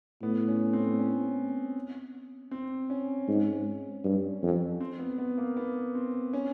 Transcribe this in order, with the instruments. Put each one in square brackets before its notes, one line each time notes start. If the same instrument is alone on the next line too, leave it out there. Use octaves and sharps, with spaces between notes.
[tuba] A2 [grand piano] B3
[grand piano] C#4
C4
C#4
C4
C#4
[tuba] G#2
G2
F2
[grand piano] C4
B3
B3
A#3
B3
C4
C#4